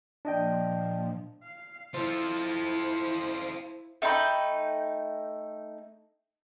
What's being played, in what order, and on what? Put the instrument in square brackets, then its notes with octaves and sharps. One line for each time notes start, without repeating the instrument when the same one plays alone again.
[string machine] A#2 F3 [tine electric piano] D4 D#5 G5
[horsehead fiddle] F5
[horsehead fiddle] E4 [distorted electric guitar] F4 A4 [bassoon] C5
[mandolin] A3 D#4 G5 B5